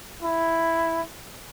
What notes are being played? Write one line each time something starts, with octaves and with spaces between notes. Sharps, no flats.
E4